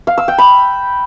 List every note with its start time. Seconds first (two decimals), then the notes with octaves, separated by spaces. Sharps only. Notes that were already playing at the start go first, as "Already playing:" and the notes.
0.07 F5
0.18 E6
0.28 G5
0.38 B5